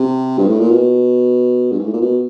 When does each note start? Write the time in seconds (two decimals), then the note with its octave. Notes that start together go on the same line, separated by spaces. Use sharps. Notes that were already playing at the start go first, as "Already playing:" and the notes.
Already playing: C3
0.38 G2
0.48 A2
0.60 A#2
0.71 B2
1.72 G2
1.79 G#2
1.86 A2
1.93 A#2
2.01 B2